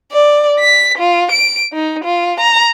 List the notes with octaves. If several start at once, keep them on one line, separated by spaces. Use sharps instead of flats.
D5
B6
F4
D7
D#4
F4
A#5